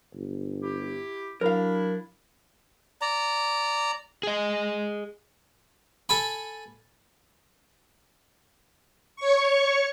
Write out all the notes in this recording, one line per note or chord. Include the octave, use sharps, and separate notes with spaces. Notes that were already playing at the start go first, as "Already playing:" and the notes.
G1
E4 G4
F#3 D4 E4 A#4 F5
D5 A#5
G#4 D#5
A4 G#5 B5
C#5 C#6